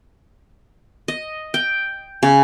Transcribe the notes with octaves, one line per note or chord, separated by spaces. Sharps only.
D#5
G5
C#3